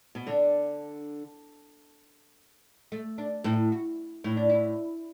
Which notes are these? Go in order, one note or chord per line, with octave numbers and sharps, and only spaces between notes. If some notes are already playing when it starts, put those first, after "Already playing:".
B2
D3 D4
A3
D4
A2 E4
F#4
A2 E4
D4
E4